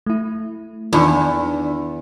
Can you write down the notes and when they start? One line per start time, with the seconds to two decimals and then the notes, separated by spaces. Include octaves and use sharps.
0.06 A3 E4
0.93 E2 D#3 D4